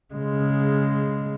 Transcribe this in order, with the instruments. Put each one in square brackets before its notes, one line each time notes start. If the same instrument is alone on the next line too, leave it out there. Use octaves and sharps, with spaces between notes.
[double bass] C#3 G#3